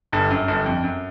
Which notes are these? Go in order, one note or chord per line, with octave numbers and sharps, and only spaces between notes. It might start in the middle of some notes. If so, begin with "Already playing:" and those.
G1 G2
F#2
G1 G2
F2
F#2